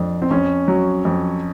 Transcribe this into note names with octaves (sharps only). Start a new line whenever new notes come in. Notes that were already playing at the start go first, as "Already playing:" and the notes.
Already playing: F2 D4
C4
F2 C#4
F#3
F2